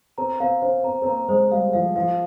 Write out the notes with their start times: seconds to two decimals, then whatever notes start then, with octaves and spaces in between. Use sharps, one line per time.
0.18 C4 A#5
0.40 C4 F5
0.62 C#4 C5
0.84 C4 A#5
1.02 C4
1.06 A#3 A#5
1.28 G#3 C5
1.51 G3 F5
1.73 F3 F5
1.96 F3 F5